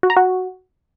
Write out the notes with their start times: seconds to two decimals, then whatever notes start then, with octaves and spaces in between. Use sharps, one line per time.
0.03 F#4
0.10 A#5
0.17 F#4